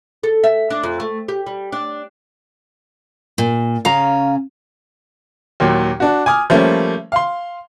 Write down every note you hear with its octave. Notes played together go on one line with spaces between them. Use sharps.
A4
E5
D4
F2
A3
G4
G3
D4
A#2
C#3 C#4 F5 A#5
D#2 A#2 F#3
D4 F#4
G#5 D6 D#6 F6
F3 G3 A3 A#3 C#4
F5 C6